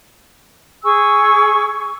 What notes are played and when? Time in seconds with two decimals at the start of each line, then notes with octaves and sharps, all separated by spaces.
0.84 G#4 G#5 C#6 E6